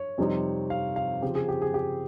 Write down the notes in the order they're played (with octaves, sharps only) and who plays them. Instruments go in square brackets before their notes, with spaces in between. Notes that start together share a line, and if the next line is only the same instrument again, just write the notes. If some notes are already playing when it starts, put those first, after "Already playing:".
Already playing: [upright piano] C#5
F2 C3 G3 C4 D#4
F5
F5
C#3 F3 C4 G4
G#4
G4
G#4
G4